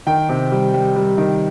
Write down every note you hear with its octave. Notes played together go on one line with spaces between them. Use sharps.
D#3 G5
C3
G3
G3
G3
D#3